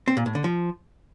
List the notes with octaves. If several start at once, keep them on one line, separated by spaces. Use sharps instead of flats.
C4
A#2
A2
D3
F3